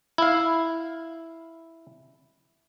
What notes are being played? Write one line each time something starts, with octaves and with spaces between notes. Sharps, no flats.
E4 F5